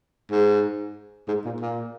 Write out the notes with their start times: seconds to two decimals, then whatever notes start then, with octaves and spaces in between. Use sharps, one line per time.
0.31 G#2
1.28 G#2
1.45 A#2
1.61 A#2